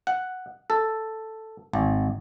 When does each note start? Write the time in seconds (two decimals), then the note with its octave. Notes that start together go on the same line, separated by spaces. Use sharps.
0.07 F#5
0.70 A4
1.73 G#1